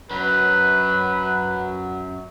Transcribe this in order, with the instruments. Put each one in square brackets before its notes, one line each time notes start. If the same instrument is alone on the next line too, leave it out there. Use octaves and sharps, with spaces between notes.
[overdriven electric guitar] F#2 F#3 [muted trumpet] B4